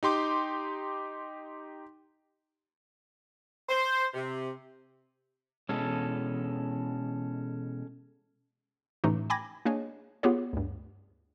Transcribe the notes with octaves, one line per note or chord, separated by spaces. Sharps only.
D#4 G4 C6 D6
C5
C3
B2 E3 G#3 C#4 A4
A2 C3 E3 A3 C#4 D#4
G5 G#5 B5 D6 G#6 A#6
A#3 D4 G#4 C#5 D#5 G#5
B3 F4 G4 G#4 C#5
D2 G2